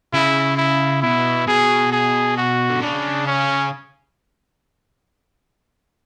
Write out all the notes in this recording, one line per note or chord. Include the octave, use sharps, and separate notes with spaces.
C#3 E4
E4
B2 E4
B2 G#4
G#4
F#4
D3
C#3 D4
C#4